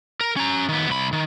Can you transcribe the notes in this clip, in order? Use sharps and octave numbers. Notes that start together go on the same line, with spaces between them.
A#4
C#4 A#5
D#3 B3
C2 B5
D#3